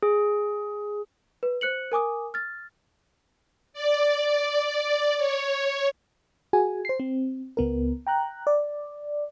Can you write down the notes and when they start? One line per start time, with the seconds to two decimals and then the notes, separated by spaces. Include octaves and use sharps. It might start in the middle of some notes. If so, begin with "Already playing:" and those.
0.03 G#4
1.43 B4
1.61 C5 F#6 C#7 F#7
1.92 A#4 G#5 D6 D#6
2.34 F6 A6
3.73 D5
5.18 C#5
6.53 F#4 G#4 G#5
6.85 C5 C7
7.00 C4
7.57 C#2 B3 A#4
8.07 G5 A#5 F#6
8.47 D5